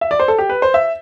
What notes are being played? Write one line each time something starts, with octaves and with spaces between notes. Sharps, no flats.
E5
D5
C5
A4
G4
B4
C5
E5